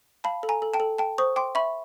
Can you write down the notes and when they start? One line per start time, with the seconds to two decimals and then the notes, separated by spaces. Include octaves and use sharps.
0.24 F5 A5 B5
0.43 A4
0.49 G#5 A#5
0.62 A4
0.74 G5 A5
0.80 A4
0.98 G5 A5
1.18 C5 C#6 D#6
1.36 G5 C6 D6
1.55 E5 B5 C#6